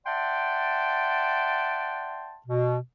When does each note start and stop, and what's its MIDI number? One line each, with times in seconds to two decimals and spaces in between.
0.06 2.37 74
0.06 2.37 76
0.06 2.37 78
0.06 2.37 79
0.06 2.37 81
0.06 2.37 84
2.47 2.77 47